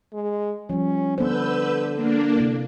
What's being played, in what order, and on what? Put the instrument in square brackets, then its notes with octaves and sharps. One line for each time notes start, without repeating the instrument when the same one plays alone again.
[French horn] G#3
[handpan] F3 G3 [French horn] C#4
[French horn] D3 [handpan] B3 C5 [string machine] B4 E6 G6
[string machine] A#3 D4
[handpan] C3 E4 A4